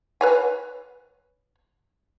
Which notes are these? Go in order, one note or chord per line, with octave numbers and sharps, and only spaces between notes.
B4 C#5 G#5